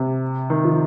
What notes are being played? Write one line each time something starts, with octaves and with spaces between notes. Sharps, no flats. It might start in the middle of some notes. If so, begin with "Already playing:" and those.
Already playing: C3
D#3
F3